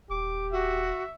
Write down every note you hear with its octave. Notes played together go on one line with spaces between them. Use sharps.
D#1 G4 D6
F#4 E5